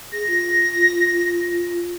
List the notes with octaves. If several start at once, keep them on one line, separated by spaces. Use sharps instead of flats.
G#4 A#6
F4